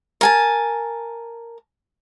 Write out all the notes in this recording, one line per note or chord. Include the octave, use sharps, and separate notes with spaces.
A#4 G#5 A5